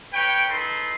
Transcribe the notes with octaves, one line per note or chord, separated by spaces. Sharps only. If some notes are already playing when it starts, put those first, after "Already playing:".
B4 C#5 G5
D#4 A4 B4 C6